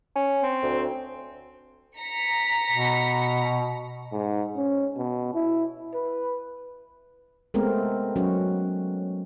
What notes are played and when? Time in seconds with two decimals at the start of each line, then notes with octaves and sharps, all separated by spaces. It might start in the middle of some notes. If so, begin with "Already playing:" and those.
0.16 C#4
0.43 C4
0.62 D2
1.99 A#5 B6 C#7
2.71 B2
4.12 G#2
4.56 C#4
4.97 B2
5.35 E4
5.94 B4
7.54 G#3 A3 B3 C4 A#4
8.16 F#3 C#4 F#4